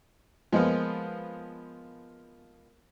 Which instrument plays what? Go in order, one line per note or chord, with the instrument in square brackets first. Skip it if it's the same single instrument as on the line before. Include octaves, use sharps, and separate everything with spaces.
[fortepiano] F3 G#3 A#3 B3 F4